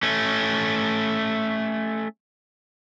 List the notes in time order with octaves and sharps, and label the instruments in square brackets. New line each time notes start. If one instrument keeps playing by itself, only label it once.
[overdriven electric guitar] A3 C#4